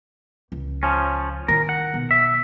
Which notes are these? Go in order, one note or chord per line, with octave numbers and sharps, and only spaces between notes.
C#2
F3 C#4
D#3 E4 A#4
F#5
B1
E5